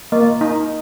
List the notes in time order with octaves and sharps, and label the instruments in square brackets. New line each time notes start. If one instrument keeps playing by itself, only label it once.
[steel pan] A#3 [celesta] D#5
[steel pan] D#4